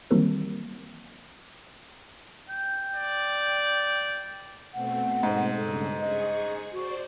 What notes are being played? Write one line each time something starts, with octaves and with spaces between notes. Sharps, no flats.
D#3 E3 F#3 G3 A#3 C4
G5
D5
B2 A3 C4 F#5
G#2
G2 C#3 A4
G#4 D#5 C#6
F#4 C5 D5